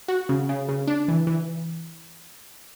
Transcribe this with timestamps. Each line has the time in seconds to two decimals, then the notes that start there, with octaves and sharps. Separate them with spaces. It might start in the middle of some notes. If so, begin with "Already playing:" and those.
0.08 F#4
0.29 C#3
0.49 C#3
0.69 C#3
0.88 D4
1.08 E3
1.27 E3